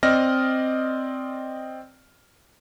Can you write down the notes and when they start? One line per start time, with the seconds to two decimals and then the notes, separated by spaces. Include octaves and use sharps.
0.03 C4 D5 D#5 F6 A#6